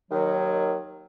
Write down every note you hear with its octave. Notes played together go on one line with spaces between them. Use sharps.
D#2 D#3 F#3